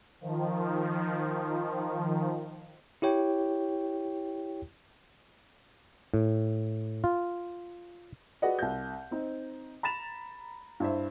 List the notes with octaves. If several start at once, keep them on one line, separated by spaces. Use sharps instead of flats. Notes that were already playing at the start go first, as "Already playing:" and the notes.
D#3 F3
E4 G4 C#5 G5
A2
F4
F#4 G#4 B4 D5 D#5 F#5
C2 G6
C4 D#4
A#5 B5 A6 E7 F7
G2 E4 C5 E5